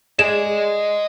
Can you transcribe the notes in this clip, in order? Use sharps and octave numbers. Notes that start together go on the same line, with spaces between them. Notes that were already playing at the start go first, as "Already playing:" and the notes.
G#4 D5 D#5 G#5 E7